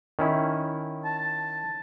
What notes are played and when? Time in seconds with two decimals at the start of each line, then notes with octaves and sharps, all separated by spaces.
0.19 D#3 C#4 E4
1.05 A5